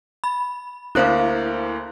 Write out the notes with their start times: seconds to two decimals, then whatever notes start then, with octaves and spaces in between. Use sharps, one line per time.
0.24 B5
0.95 D2 A#3 E4 C5 F5 F#6